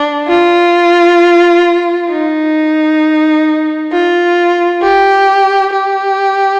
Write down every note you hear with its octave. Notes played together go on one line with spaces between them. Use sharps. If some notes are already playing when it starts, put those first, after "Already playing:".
Already playing: D4
F4
D#4
F4
G4
G4